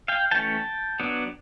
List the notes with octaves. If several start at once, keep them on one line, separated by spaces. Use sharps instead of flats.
F5 G5
E3 A3 C#4 G5 A5
F#3 B3 D4